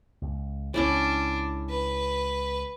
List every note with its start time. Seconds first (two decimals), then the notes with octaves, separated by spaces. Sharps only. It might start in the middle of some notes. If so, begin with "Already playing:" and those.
0.22 C#2
0.74 C#2 C#3 C#4 D4 E4 D5
1.69 B4